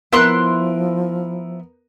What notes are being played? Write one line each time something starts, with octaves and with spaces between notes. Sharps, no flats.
F3 B3 E4 A#4 C6 F#6